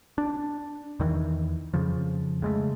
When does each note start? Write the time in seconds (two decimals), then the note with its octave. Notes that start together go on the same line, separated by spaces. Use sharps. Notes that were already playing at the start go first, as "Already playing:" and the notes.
0.18 D4
1.00 E2 D#3 E3
1.74 F2 C#3 F3
2.42 C#3 G#3 A3